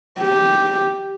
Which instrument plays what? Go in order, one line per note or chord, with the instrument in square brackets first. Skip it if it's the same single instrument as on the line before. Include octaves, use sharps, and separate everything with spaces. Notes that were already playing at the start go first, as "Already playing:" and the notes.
[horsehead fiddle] G4